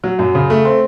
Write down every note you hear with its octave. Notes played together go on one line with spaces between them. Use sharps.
F#3
F#2
C#3
A3
C4